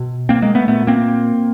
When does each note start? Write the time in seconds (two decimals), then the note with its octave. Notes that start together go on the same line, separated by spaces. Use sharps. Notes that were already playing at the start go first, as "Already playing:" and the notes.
Already playing: B2
0.29 A#3 C4
0.42 G#3 A#3
0.55 A3 B3
0.68 A#2 A3 B3
0.87 A#3 C4